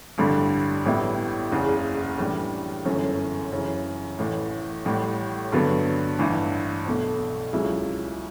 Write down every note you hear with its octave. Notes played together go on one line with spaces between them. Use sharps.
A1 G2 D3 G3
A1 A2 G3 B3 E4
F#1 E2 C#3
A2 E3 G3 D4
G1 F#2 E3 A3 C#4
F#2 C#3 E3
A1 A2 E3
A1 A2 G3
G2 D3 F#3 B3
A1 G2 E3
B1 B2 A3
C#2 C#3 F#3 C#4 E4